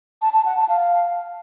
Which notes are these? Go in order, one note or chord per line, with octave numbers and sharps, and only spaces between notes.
A5
A5
F#5
A5
F5